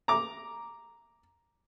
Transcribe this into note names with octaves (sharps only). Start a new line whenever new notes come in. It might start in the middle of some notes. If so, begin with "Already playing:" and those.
A#5 D6